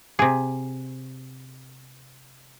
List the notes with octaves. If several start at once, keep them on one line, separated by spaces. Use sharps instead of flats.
C3 G#4